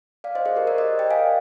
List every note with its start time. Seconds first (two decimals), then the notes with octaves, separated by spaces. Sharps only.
0.24 D5 F5
0.35 C5 D#5
0.45 G#4 C5
0.56 G4 A#4
0.67 A#4 D5
0.78 C5 D#5
0.99 D#5 G5
1.10 F5 G#5